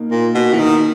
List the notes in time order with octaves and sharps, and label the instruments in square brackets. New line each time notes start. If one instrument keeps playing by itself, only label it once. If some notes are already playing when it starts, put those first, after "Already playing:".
Already playing: [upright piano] B2 A#3 D#4
[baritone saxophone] A#2
B2
E3
D#3